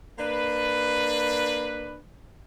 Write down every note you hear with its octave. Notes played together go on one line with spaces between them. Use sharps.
A#3 D4 B4